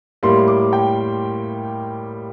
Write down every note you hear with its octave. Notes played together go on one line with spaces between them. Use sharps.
A2 G3 A#3 C6
D6
G5